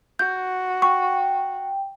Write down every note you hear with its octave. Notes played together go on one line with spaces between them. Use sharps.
F#4 G6
G5 C#6